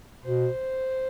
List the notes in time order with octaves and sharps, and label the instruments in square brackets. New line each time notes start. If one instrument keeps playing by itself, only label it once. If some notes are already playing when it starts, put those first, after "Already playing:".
[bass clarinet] B2 [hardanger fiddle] C5